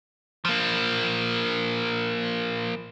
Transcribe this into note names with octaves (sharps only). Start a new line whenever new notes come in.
F3 A#3